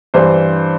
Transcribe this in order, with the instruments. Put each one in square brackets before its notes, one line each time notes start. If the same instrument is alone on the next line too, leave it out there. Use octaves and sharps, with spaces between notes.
[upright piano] G2 E3 C5